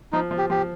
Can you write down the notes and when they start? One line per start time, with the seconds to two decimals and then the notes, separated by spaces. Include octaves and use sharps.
0.12 F3 D#4
0.31 F3
0.38 G4
0.50 F3 G4